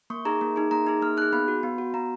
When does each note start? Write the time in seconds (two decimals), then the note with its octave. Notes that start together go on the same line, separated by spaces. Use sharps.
0.10 A#3 C#6
0.25 D#4 G#4 A#5
0.41 A#3
0.56 D#4 G#4
0.71 A#3 A#5
0.87 D#4 G#4
1.02 A#3 F6
1.17 D#4 G#4 F#6
1.33 B3 B5
1.48 F#4
1.63 B3
1.78 F#4
1.94 B3 A#5